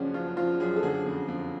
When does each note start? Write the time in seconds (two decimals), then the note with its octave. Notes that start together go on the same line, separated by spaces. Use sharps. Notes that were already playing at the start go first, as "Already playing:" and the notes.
Already playing: F#2 C#3 F3 C#4 D4 F#4
0.14 F3 F4
0.37 F3 F4
0.60 F#2 G#4
0.76 A4
0.83 D3 G#4
1.06 F2
1.28 F2